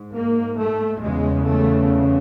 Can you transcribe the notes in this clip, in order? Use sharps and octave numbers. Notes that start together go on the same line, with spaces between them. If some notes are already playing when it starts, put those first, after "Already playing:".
Already playing: G#2
A#3
A3
E2 C#3 G#3
A3